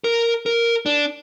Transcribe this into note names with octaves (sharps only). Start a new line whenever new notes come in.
A#4
A#4
D4